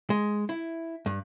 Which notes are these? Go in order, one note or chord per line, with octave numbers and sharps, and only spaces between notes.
G#3
E4
G2